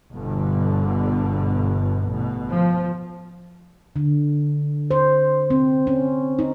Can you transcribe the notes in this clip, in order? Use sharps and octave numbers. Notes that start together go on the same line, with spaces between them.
G1 G2 B2 D3
A1 B2
F3
D3
C5
C4
C#4
D#4